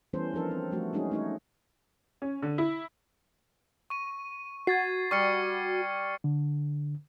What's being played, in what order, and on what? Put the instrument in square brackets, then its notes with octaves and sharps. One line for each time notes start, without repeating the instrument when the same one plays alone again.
[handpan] E3 G3 B3 C#4 A4 C5
F3 D4 A4 A#4
C4
F3 G3 A3 F#4
G3 G#3 C#4 D#4 F#4 G#4
A3 D#4 C#5
[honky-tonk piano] C#4
D3
E4
[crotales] C#6 D#7
[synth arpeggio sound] F#4 [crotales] G#6 A6 C7
[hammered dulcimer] G3 [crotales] C#6 F6 C#7
[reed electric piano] D3